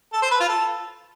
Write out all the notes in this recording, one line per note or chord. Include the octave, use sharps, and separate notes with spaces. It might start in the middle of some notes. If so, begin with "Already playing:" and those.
A4
C5
B4
F4
A4